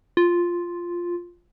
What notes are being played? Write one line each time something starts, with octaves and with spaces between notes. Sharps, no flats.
F4